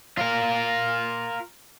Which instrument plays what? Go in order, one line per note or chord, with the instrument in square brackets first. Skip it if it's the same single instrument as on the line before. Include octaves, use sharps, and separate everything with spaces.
[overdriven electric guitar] F4 A#4